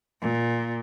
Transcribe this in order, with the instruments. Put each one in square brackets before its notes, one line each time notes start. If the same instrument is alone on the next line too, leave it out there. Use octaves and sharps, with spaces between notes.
[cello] A#2